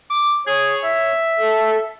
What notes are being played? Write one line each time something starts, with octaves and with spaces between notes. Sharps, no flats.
D6
G#4 C#5
E5
A4